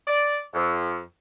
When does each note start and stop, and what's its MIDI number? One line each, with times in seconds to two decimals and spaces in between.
0.08 0.39 74
0.54 1.00 41